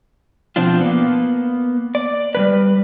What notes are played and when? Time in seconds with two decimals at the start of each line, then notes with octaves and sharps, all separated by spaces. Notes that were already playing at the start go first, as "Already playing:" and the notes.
0.56 B2 F3 C4 D4 F4
0.81 A#3 B3
1.95 D5
2.35 G3 G#3 B4